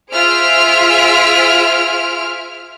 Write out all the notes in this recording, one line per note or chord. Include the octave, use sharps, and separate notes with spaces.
F4 G#4 C5 E5 F6 D7